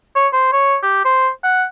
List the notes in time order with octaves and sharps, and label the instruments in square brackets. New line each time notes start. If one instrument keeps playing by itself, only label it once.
[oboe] C#5
C5
C#5
G4
C5
F#5